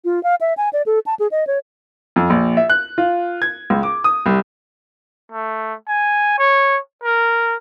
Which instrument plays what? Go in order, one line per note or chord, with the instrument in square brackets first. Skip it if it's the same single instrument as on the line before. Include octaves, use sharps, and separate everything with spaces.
[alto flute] F4
F5
E5
G#5
D5
A4
A5
G#4
D#5
C#5
[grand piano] F2
A#1
E5
F#6
F4
G#6
C#2
D6
D#6
C2
[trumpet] A3
G#5
C#5
A#4